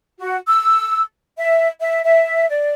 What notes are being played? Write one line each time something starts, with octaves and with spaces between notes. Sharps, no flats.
F#4
E6
E5
E5
E5
D5